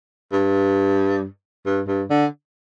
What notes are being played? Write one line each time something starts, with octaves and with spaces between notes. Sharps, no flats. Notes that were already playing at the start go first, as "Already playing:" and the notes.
G2
G2
G2
D3